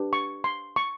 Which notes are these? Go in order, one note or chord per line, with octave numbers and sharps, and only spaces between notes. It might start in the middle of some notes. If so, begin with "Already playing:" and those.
Already playing: D4 G4 B4
C#6
C6
C#6